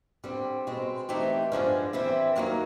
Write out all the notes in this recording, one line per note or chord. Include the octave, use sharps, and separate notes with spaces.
D3 G3 C4
B2 G#3 C4
E3 A3 C4 D#4 G4
G2 D3 F3 G#3 C#4
E3 G3 C4 E4
F#2 D#3 F#3 A#3 D#4